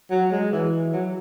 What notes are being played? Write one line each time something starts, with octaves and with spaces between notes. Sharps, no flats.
F#3
G#3
E3
F#3